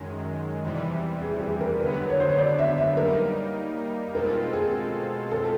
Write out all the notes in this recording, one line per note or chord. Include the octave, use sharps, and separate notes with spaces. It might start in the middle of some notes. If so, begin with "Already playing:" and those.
Already playing: F#2 D#3 G#3
E2 C3 E3 G3
G#4
G#4
A#4
D3 F#3 B3 B4
C#5
C5
C#5
D5
E5
E5
G3 A#3 D#4 A#4
B2 G#3 C4 F4 A4 A#4
G#4
A4